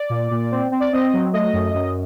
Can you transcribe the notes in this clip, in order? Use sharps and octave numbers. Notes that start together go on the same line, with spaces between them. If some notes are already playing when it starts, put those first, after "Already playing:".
Already playing: D5
A#2
A#2
C4
C4
D5
C4 D#5
F#3
A3 D#5
F#2
F#2